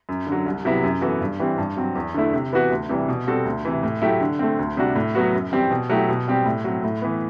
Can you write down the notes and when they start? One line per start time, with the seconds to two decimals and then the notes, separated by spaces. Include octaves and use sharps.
0.09 F#2
0.27 D3
0.32 F#3
0.46 C2
0.65 C3 F#3 B3 E4
0.84 F#2
1.01 E3 B3 F#4 A4
1.21 G2
1.39 E3 G3 C4
1.58 G2
1.77 F#3 C4
1.95 E2
2.14 D3 A3 E4
2.33 C3
2.53 E3 B3 F#4 B4
2.71 D2
2.89 C3 E3 G3
3.08 B2
3.27 G3 C4 F#4 A4
3.45 D2
3.65 C3 E3
3.83 A2
4.02 F#3 A3 E4 G4
4.21 D3
4.39 A3 C4
4.59 D2
4.77 C3 G3 D4 F#4
4.95 A2
5.15 F#3 B3 F#4
5.33 F#2
5.52 E3 G3 C4 G4
5.71 B2
5.90 F#3 A3 E4 G4
6.09 B2
6.28 G3 C4 G4
6.46 A2
6.64 F#3 C4
6.84 A2
7.02 E3 B3